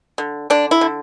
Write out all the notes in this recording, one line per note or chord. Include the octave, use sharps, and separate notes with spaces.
D3
D3 D4
E4
D3